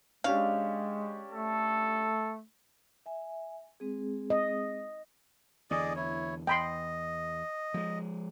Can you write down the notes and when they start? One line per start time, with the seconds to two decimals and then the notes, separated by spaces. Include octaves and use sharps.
0.24 G#3 C#4 D4 G4 F5
1.32 A3 A4
3.06 E5 G#5
3.80 G#3 C4 G#4
4.30 D#5
5.71 E2 D3 G#4 D5 D#5
5.96 E4 C#5
6.47 E2 D#5 G5 B5 C6
7.74 F3 G#3